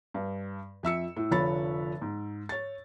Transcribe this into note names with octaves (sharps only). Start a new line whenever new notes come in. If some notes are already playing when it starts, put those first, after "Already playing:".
G2
F2 E5 E6 C#7
A2
F1 D3 F3 C#5 B5 A6
G#2
C#5 A6